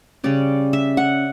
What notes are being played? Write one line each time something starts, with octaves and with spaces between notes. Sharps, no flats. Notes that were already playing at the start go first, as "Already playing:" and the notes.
C#3 G3 C#4 D5
E5
F#5